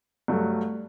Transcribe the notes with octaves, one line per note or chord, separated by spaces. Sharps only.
G2 F#3 A3